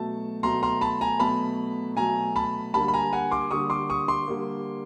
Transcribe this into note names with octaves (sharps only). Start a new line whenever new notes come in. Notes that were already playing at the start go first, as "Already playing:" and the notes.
Already playing: B2 F#3 A3 A5
B2 F#3 A3 A#5 C6
A#5 C6
A5 B5
G#5 A#5
B2 F#3 A3 A5 B5
B2 F#3 A3 G#5 A#5
A5 B5
D3 G3 A#3 A5 B5
B5
G#5 A#5
F#5 G#5
C6 D6
D3 G3 A#3 C#6 D#6
C6 D6
C#6 D#6
C6 D6
D3 G3 A#3